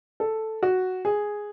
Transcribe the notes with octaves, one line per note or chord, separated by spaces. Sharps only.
A4
F#4
G#4